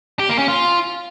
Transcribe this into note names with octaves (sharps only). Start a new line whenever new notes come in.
G4
A#3
C#4
F4